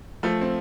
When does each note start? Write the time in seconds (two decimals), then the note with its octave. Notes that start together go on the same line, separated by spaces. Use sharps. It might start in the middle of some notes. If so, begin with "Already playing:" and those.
0.23 F3 A3
0.41 C4